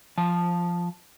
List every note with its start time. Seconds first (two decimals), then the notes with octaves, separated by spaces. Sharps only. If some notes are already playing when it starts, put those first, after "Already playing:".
0.18 F3 A5